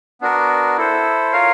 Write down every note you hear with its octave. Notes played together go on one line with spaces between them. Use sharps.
B3 D4 F#4 A#4
E4 A4 C5
F4 A#4 C#5 F5